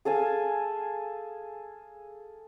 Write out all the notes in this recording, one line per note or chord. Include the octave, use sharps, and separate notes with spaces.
G#4 A4 F5 G#5